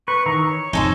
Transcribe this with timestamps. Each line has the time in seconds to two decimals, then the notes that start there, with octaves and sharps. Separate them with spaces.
0.08 B4 C#6
0.26 D#3 E3 A#5 C#6
0.49 C#5
0.73 F2 D#4 A4 C5 G#5